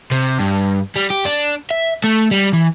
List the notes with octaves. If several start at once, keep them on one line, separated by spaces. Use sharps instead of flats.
C3
G2
G3
G4
D4
E5
A3
G3
E3